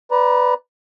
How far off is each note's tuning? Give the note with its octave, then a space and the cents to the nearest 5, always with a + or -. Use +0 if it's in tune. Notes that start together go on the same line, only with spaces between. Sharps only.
B4 +10 D5 +0 A#5 +35